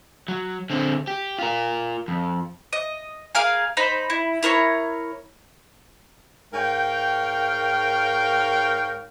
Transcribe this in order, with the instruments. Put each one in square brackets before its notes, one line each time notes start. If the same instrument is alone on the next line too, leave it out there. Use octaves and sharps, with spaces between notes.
[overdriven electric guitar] F#3
D3 C4
G4
F4 A#4
F2
[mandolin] D#5
G#4 A#4 F5 G#5
D#4 C5 B5
E4
E4 A#4 C5 C#5
[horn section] G#2 A#4 C#5 F5 G5